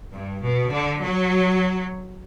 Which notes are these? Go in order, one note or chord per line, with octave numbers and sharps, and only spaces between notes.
G2
B2
D3
F#3